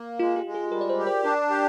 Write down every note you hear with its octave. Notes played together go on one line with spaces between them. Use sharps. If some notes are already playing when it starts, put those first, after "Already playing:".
Already playing: A#3
G#3 F4
G4
G#3
G#4
G3 A#4
D5
C5
G4
C5
D4 A#4
G4